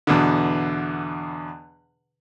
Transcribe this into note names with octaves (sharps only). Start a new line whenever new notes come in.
E2 B2 D3